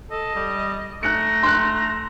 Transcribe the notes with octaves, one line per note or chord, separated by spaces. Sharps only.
A4 D#5
G3
A3 A#5 F#6 C#7
C6 F#6